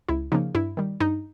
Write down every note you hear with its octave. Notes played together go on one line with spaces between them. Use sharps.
C#2 E4
C#3 F3 A#3 D#4
G2 E4
D#3 G3
G2 D#4